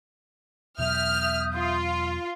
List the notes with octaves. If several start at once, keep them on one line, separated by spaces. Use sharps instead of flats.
E2 B2 F#3 E5 D#6 F6 G6
F4